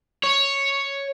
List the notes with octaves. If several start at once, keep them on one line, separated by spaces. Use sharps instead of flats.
C#5